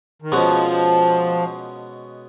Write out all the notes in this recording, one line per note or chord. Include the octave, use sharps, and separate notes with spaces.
D#3
B2 F3 G#3 C#4 F#4